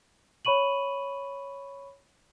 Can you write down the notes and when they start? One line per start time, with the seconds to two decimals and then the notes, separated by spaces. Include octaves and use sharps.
0.45 C#5 B5 C#6 D#7 F#7